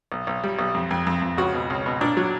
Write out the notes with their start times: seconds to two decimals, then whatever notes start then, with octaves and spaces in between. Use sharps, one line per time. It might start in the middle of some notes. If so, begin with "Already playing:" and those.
0.12 B1
0.27 B1
0.44 G3
0.59 B1
0.74 F2
0.91 F2
1.07 F2
1.22 F2
1.38 C#2 F#4
1.54 B2
1.70 C#2
1.86 B2
2.01 A#2 D4
2.17 F#3